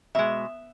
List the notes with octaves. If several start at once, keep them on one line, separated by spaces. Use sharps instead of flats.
B2 G#3 E5